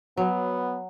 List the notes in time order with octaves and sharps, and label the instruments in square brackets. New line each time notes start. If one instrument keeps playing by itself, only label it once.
[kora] F#3 [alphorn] B3